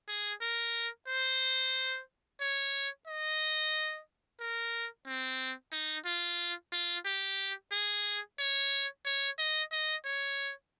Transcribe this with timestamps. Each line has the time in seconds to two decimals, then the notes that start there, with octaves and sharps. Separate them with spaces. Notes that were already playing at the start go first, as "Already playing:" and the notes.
0.09 G#4
0.42 A#4
1.08 C5
2.41 C#5
3.07 D#5
4.40 A#4
5.06 C4
5.73 D#4
6.06 F4
6.72 F4
7.06 G4
7.72 G#4
8.39 C#5
9.05 C#5
9.39 D#5
9.72 D#5
10.05 C#5